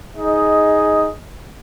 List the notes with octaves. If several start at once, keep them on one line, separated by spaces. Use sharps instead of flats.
D#4 G#4 D#5